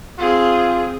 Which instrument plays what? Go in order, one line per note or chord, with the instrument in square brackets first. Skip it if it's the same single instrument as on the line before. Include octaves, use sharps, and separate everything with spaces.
[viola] C4 G#4 [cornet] F4